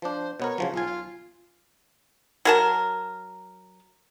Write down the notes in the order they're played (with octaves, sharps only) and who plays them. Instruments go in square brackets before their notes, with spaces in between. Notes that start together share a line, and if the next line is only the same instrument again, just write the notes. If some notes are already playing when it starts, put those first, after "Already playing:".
[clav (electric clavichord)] F3 D4 [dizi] C5
[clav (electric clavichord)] B2 B3 A#4 [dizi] C#5
[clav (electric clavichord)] C#3 F3 F#3
[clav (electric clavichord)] B1 G#5 [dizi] F4
[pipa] F#3 A#4 A5